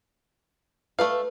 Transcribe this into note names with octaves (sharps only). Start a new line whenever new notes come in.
A3 B4 D5 F5